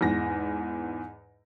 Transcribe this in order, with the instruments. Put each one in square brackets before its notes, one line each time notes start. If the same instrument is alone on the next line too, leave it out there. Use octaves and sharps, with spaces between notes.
[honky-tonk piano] E2 G#2 A#6